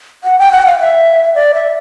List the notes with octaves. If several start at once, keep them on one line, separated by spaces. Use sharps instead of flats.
F#5
G5
F#5
F5
E5
D5
E5